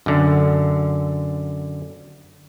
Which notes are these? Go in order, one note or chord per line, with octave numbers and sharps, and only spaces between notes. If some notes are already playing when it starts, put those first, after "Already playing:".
F#2 D3